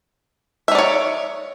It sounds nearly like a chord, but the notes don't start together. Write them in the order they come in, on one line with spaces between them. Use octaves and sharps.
E5 D#4 D5 C#5